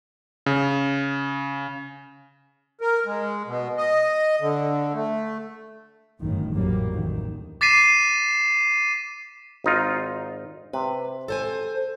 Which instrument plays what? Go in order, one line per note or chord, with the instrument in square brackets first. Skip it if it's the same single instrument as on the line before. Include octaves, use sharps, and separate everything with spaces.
[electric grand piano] C#3
[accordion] A#4
G#3
B2
D#5
D3
A3
[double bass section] G1 F#2 A2 D#3
A1 F2 A#2 F#3 G3 A#3
A1 D2 D#3
[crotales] D6 A6 B6 C7 D#7 E7
[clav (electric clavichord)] G#1 D#4 F4
[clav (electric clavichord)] C3 [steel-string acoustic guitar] B4
[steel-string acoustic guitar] A4 C5 G#5